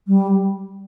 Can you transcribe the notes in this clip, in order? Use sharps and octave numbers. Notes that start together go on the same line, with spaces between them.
G3